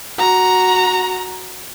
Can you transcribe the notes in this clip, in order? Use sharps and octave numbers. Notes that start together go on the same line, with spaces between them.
F#4 A#5